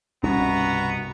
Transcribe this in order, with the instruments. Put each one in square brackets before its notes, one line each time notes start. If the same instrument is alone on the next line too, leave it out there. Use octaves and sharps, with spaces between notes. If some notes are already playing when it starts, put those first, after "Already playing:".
[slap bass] C2 G2 B2 [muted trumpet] B3 [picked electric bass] C#4 D4 [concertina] F#4 A#5